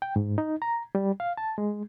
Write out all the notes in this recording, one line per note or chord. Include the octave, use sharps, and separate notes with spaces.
G5
G#2
D#4
A#5
G3
F5
A5
G#3